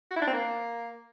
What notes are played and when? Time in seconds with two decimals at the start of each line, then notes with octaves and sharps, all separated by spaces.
0.11 F#4
0.16 E4
0.22 D4
0.27 C4
0.33 A#3